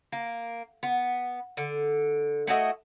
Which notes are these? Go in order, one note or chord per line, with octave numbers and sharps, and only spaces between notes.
A#3
B3
D3
A3 E4 F#4 D#5